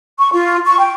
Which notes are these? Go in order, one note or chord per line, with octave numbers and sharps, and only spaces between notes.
C#6
F4
C#6
G5